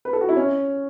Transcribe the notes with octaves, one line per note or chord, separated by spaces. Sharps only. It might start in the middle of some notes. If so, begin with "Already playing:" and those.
B4
A4
F#4
E4
C#4